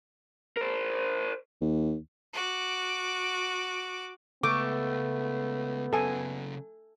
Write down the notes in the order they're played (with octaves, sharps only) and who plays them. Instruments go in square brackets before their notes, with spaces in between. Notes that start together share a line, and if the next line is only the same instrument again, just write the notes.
[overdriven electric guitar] A#4 C5
[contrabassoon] D#2
[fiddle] F#4 D6
[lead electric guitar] C#2 [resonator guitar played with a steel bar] A3 [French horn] B3 [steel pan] D6
[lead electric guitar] C#3 F#3 [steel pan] A4 G#5